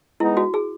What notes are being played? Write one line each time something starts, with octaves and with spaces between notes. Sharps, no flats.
G#3 B3 D#4 E4
F#4
G#4